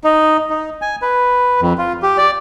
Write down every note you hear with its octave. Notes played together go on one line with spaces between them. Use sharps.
D#4
D#4
G#5
B4
F2
F4
G4
D5